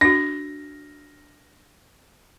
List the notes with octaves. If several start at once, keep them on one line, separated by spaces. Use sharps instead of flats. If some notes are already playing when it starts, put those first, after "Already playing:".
D4 F#4 A#6